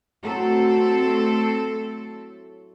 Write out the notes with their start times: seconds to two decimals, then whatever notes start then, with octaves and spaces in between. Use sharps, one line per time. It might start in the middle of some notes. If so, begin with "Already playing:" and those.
0.24 A2 F#3 A3 C4 A4